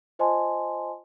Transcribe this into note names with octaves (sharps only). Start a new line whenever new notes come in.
F4 C5 D#5 G#5 A5 C6